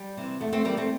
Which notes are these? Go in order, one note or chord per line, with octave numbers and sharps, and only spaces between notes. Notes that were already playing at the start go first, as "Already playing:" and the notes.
Already playing: G3
C3 E3
E2 A3
A3 C4
E3 G3 A#3
A3 C4